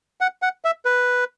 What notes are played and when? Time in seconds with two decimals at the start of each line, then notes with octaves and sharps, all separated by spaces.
0.21 F#5
0.42 F#5
0.65 E5
0.85 B4